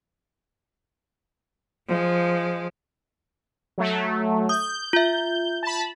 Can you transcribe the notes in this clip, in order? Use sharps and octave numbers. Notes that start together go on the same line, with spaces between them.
F3 G#3
F#3 A3
D#6 G6
F4 E5
A5 B5